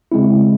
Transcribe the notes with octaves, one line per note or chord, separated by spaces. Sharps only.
C#3 G#3 C4 E4